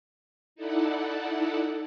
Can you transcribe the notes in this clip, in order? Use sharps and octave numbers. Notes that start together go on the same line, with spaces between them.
D#4 E4 A4 D5 F#5